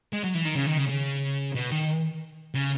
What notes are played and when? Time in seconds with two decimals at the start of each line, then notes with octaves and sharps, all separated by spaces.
0.13 G#3
0.24 F#3
0.34 E3
0.45 D#3
0.55 C#3
0.67 D#3
0.77 C#3
0.88 C#3
1.55 B2
1.71 D#3
2.55 C#3